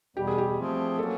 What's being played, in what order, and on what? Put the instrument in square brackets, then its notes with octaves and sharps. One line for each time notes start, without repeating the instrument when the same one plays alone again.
[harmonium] E2 B2 G3 [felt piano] G4
[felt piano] G#4
G4
[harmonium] F3 A3 C4 F4 G#4
[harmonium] F#3 A#3 C#4 [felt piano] A4